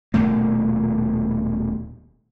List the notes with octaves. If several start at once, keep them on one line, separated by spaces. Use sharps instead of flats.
D#1 B2 A3 A#3